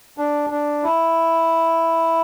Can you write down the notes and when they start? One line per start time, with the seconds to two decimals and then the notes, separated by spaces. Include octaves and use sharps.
0.18 D4
0.50 D4
0.83 E4